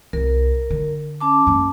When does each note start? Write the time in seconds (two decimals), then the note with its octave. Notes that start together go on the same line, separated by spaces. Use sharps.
0.13 C2 A#4
0.71 D3
1.21 C#4 A5 D6
1.47 F#2 A#3